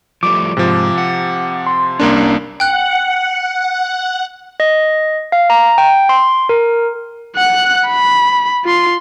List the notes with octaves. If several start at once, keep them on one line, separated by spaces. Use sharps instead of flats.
F3 G3 A3 D6
G#2 C3 F3
F#5
C6
C2 A#3 C#4 D4 A#4 A#5
F#5 G5 F#6
D#5
F5
A#5
G5
C6
A#4
F#5 F#6
B5
F4 C6